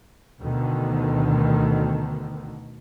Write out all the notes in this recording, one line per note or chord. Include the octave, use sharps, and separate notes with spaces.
D2 B2 D3 D#3